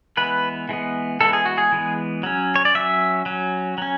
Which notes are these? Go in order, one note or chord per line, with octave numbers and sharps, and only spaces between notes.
E3 G#3 B3 B4
E3 G#3 B3
E3 G#3 B3 A4
G#4
F#4
G#4
E3 G#3 B3
F#3 C#4
C#5
D5
F#3 C#4 E5
F#3 C#4
F#3 C#4